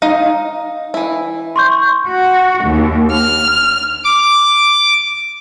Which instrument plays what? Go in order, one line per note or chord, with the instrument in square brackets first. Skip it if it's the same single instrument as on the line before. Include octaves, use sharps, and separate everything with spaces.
[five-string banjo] D#4 D#5 F5
E3 E4
[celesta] C6 C#6 G6
[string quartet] F#4
D#2
F6
[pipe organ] D6